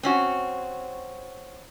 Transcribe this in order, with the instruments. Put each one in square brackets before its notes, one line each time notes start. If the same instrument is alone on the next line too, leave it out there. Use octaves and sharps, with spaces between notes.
[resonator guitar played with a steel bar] C4 C#4 F#4